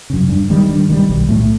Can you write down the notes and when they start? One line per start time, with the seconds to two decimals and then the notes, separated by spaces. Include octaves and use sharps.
0.10 F#2 C#3
0.29 G2
0.50 D#3 G3
0.69 G2
0.89 D#3 G3
1.09 B1
1.29 A2 E3 A3